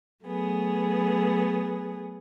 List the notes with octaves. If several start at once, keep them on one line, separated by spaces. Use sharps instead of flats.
F#3 A3 B3 G#4